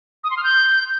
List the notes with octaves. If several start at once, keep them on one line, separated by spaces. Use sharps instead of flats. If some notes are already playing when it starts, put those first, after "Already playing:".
D#6
C6
F6
G6